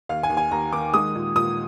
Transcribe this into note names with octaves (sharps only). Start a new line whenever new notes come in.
D#2 F5
G#5
D#2
G#5
D#2 A#5
D#3 D6
G#3 D#6
A#2
A#2 D#6